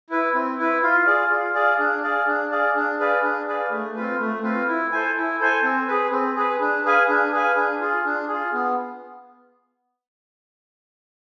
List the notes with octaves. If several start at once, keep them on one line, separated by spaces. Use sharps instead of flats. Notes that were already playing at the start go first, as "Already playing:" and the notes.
E4 B4
C4
E4 B4
F4
G#4 D5 F5
F4
G#4 D5 F5
D4
G#4 D5 F5
D4
G#4 D5 F5
D4
G#4 B4 D5 F5
D4
G#4 B4 D5 F5
A3
C4 F4 B4
A3
C4 F4 B4
E4
A4 C5 G#5
E4
A4 C5 G#5
C4
G#4 B4
C4
G#4 B4
D4
G#4 B4 F5 G#5
D4
G#4 B4 F5 G#5
D4
F4 G#4
D4
G#4
F4
B3